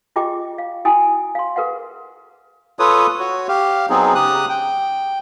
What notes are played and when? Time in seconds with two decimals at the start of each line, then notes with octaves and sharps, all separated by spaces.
0.16 F4 G4 G#4 D#5 G5 D6
0.58 F5
0.85 E4 F#4 G5 G#5 D#6
1.35 F5 C6
1.56 G#4 A#4 B4 F5 F#5
2.79 F4 A4 B4 C#5 D#6
3.20 F#4 C#5
3.48 G4 F5
3.90 F#3 B3 C4 D#4 G#4
4.15 C#3 G4 D#6 F#6
4.49 G5